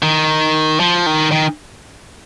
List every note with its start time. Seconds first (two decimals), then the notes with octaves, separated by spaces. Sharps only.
0.02 D#3
0.80 F3
1.06 D#3
1.32 D#3